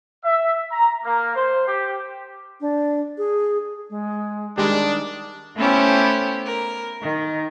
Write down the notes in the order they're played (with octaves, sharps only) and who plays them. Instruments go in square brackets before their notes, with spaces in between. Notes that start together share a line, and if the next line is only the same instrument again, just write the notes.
[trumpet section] E5
A#5
A#3
C5
G4
[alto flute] D4
G#4
[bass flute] G#3
[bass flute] D#3 [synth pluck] G3 G#3 [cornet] D4
[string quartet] A3 B3 C#4 E4 G4 C5
A#4
D#3